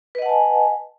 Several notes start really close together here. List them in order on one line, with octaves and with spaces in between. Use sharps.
B4 D#5 F#5 A5 G#5